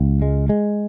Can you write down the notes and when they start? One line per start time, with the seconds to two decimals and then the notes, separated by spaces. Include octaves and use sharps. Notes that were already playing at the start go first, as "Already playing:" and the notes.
Already playing: C#2
0.22 G#3
0.49 G#3